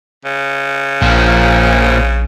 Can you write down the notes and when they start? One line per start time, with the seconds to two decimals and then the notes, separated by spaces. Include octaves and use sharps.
0.25 C#3
1.02 A#1 A#2 F3